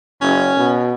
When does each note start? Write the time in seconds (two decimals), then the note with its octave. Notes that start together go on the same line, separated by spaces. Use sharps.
0.22 F#1 C#4
0.57 B2